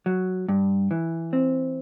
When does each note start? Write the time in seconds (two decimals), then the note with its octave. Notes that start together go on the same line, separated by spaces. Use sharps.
0.06 F#3
0.48 G2
0.91 E3
1.33 C4